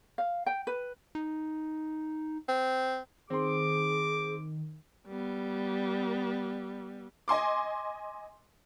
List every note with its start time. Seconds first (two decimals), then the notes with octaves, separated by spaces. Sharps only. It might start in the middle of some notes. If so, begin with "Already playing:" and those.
0.18 F5
0.46 G5
0.67 B4
1.15 D#4
2.49 C4
3.30 D#3 C4 G#4 C6 D6
5.07 G3 B3
7.28 D#5 G#5 C6 D6